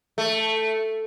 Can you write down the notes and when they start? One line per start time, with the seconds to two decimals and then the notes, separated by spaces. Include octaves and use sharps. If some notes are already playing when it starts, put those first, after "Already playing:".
0.18 A3